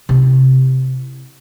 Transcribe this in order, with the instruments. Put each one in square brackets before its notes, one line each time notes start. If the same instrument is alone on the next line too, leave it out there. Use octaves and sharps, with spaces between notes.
[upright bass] C3 E4